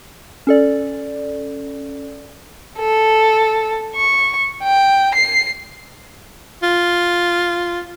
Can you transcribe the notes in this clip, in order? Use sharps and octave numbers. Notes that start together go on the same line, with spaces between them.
C#4 A4 D5
A4
C#6
G5
C7
F4